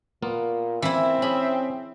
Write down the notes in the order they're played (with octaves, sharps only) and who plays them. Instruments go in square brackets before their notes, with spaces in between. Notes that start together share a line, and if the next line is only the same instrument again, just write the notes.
[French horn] A#2 [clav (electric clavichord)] A#3 B3 F4
[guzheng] E3 E4 [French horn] C4 [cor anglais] E5
[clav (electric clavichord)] C#4 G#4 [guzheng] B5